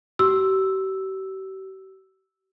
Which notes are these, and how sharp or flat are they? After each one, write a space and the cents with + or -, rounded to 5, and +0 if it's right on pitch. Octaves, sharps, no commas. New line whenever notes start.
G4 -40 E6 +0